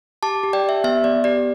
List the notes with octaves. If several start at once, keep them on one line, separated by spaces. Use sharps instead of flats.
G4 A5 D6
G4
D5 G5
G4 E5
B3 E5
B3 D5
G4 D5